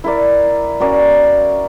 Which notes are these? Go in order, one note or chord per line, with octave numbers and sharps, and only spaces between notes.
E4 A#4 D5
C#4 F#4 A#4 D5